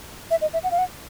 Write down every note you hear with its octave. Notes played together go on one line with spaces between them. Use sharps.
E5
D#5
E5
F#5
F5
F#5